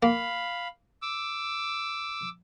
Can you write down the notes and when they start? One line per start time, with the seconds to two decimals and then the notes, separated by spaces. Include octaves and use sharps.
0.03 A#3 F5 B5
1.02 D6 E6